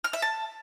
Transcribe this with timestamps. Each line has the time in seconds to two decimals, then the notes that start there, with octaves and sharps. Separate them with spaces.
0.04 F6
0.13 E5
0.22 A5